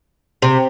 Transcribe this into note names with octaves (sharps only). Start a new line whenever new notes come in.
C3